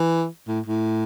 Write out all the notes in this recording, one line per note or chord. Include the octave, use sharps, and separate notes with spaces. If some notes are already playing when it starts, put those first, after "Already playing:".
Already playing: E3
A2
A2